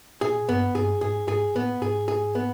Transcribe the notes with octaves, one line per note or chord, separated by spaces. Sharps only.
A#2 G#4
G2 B3
G2 G#4
G#2 G#4
G#2 G#4
A2 B3
G#2 G#4
G#4
B3